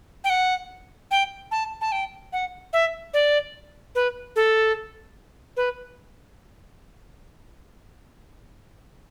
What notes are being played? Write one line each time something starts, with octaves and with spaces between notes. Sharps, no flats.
G5
F#5
G5
A5
A5
G5
F#5
E5
D5
B4
A4
B4